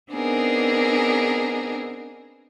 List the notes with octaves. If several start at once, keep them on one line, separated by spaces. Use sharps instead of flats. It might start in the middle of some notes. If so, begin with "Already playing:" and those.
B3 C4 D4 D#4 G#4 A#4